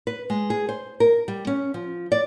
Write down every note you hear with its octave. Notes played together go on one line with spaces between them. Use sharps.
B4
G#3
G#4
C5
A#4
G3
C#4
F3
D5